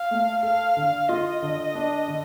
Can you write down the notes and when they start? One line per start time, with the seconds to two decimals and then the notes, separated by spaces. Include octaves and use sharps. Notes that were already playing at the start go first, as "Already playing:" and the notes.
Already playing: F5
0.11 A3
0.43 A4 F5
0.77 D3
1.09 F4 D#5
1.42 D3
1.75 D4
2.08 D3